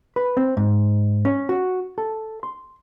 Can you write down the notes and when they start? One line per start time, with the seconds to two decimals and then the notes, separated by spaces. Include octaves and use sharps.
0.16 B4
0.37 C4
0.57 G#2
1.25 C#4
1.49 F#4
1.98 A4
2.43 C6